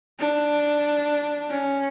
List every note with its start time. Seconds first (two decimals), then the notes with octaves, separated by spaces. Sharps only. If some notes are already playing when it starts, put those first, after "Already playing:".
0.19 D4
1.49 C#4